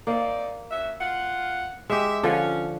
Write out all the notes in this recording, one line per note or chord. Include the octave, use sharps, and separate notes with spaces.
A#3 C4 D#4 D5
C#4 F#4 E5
F4 F#5
G#3 G4 E5
D3 F3 C#4